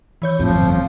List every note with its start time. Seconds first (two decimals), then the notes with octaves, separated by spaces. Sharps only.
0.22 E3 C#5 G6
0.39 A#1 F2 A2 F3
0.55 G1 F2
0.71 F3